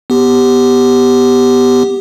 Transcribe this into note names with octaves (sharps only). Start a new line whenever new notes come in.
B3 G4